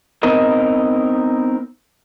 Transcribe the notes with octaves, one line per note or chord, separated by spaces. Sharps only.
B3 C4 D#4 A#4 D#5